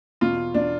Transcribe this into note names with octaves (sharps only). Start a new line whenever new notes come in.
E2 B2 F4
E2 B2 D4